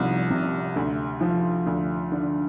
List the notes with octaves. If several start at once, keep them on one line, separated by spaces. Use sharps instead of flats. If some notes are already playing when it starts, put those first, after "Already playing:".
Already playing: C2 F3
C3
D2
F3
D2
D3